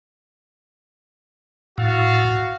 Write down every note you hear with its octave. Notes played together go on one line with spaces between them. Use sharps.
A2 F#4 F5